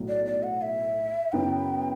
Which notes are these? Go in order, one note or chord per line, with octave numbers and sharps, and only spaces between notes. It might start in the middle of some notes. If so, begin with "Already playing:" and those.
Already playing: B1 A2 F#3
D5
D5
F#5
E5
F#2 C#3 F#3 B3 E4 G5